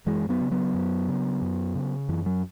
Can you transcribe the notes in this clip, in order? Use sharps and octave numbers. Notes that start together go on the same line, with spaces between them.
F#2 E3 G#3
F#3 B3
C#3
F#3 B3
F#2
C#3
F#2
C#3
F#2 E3
F#3